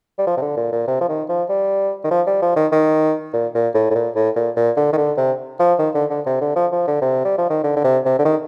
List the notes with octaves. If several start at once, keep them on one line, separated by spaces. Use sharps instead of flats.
G3
F3
C3
D3
A#2
A#2
C3
F3
D#3
F3
G3
D#3
F3
G3
F3
D#3
D#3
A#2
A#2
A2
A2
A#2
A2
A#2
A#2
D3
D#3
D3
C3
F3
D#3
D3
D3
C3
D3
F3
F3
D3
C3
G3
F3
D#3
D3
D3
C3
C3
D3
D#3